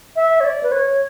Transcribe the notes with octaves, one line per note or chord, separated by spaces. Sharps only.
E5
C#5
D5
B4
C#5